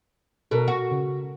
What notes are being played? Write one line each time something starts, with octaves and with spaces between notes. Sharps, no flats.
B2 A4 A#4
F#4
C#3